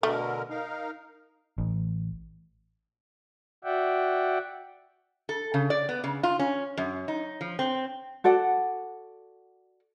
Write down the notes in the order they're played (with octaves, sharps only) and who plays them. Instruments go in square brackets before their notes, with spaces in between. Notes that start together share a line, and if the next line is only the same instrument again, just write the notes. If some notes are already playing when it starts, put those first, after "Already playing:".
[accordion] B2 D3 A#4 [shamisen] A3
[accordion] D#4 A#4 F5
[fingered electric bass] A1
[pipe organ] F#4 D5 E5 F#5 G5
[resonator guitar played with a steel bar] A4
C#3
D5
B3
C#3
F4
C#4
F#2
D#4
F3
C4
[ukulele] F#4 A4 D5 F#5